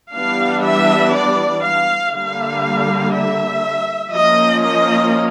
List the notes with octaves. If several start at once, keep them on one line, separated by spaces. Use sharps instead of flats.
E3 G3 B3 D4 F5
E5
D5
F5
D3 G3 A#3 F5
E5
F3 A#3 C#4 D#5
D#5